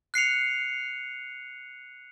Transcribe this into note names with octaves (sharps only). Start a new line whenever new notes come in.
F#6 C7 C#7 F7